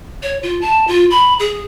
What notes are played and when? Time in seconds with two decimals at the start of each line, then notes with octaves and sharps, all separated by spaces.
0.23 C#5
0.43 F4
0.61 A5
0.88 F4
1.10 B5
1.40 G#4